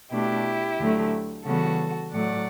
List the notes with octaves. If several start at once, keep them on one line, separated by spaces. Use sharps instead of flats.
B2 A3 D4 E4 G4
D2 D3 F#3 A3
C#3 E3 G3 B3 F#4 A4
A2 F#3 A3 D5 F#5